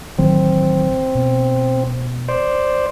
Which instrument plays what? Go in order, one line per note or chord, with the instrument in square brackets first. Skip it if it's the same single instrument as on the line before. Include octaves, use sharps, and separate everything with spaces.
[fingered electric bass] A1 D#3 F#3 [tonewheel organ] C4
[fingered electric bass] B2
[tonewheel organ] C5 D5